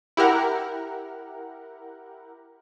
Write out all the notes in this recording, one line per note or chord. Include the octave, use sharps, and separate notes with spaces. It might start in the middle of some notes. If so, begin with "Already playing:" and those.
E4 G4 A#4 F#5